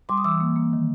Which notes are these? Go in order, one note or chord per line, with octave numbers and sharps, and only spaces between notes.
G3 C6 D6
D#6
E3 D6 E6
A#3
A#3
D#3